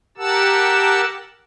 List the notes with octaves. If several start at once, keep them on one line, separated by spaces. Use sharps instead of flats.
G4 A#4 F#5 A5 E6